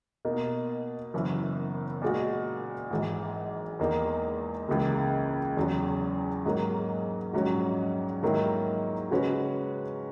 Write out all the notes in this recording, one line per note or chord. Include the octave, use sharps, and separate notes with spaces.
B2 A#3 D#4
F#1 F#2 E3
A#2 G#3 D#4 F#4
G#1 G#2 E3
E2 D#3 A#3 D#4
C#2 C#3 E3 A#3
E2 C#3 F#3
G#2 F#3 A#3
A#1 G#2 F#3 C#4 F#4
G#2 D#3 F#3 A#3 E4
C#3 G#3 C#4 F#4 B4